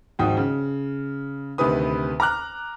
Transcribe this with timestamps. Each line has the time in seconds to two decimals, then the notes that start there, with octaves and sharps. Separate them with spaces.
0.19 G#1 G#2 F3 F#4 G5 D#6
0.37 C#3
1.58 D2 C3 D#3 B4 D#6
2.20 A#5 D6 F6 F#6